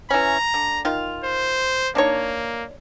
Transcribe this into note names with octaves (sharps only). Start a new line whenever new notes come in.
E3 C#4 A#5
D3
D#3 F4
C5
A#3 D4 D#4 C#5